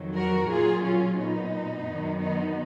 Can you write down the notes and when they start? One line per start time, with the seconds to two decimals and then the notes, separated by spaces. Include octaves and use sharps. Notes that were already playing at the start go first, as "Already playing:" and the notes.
Already playing: F2 D#3 F#3
0.15 F#4 A#4
0.50 A#2 F#3 F4 G#4
0.83 C#4 F4
1.18 A#2 F#3 B3 D#4
1.86 F#2 D#3 F#3
2.20 B3 D#4